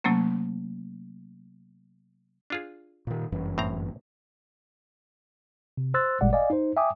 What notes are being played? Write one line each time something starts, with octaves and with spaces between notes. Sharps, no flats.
C3 F#3 A3 A#3 C#4
D4 F4 G#4
A#2 D#3
G1 F#2 E3
A2 C4 A#5
C3
C5 C6 E6 F#6 A6
G#1 A#2 G3 G#3 D5 F#5
D5 D#5 F5 G#5
D#4 C5
E5 G5 G#5 D6 D#6